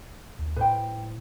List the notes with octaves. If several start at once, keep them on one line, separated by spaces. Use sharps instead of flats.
D#2
A2 B4 C5 G5